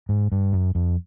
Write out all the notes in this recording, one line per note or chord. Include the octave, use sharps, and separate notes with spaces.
G#2
G2
F#2
F2